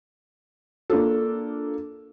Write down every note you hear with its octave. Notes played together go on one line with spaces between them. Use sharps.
A#3 D4 F4 A4